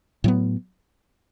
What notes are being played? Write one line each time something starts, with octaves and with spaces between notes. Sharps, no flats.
A2 F#3 B3